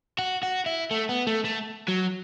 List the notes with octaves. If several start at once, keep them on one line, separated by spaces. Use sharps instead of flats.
F#4
F#4
E4
A3
B3
A3
A3
F#3